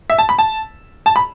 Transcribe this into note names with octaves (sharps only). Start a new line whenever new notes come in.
E5
A5
B5
A5
A5
B5